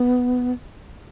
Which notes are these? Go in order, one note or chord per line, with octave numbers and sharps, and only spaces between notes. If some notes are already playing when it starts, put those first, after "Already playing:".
Already playing: B3